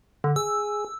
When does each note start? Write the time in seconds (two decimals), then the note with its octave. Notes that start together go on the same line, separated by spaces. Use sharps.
0.24 D3
0.36 G#4 E6